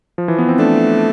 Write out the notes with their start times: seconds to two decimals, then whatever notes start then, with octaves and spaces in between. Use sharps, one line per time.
0.18 F3
0.28 E3
0.39 B3
0.48 C4
0.59 A3 D4